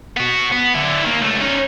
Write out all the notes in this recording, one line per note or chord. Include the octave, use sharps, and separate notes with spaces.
B3 F#4
B3
D3 E4
D#3 A#3
C#2 A3
C#4 D#4